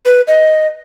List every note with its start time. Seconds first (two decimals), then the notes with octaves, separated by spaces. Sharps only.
0.05 B4
0.28 D#5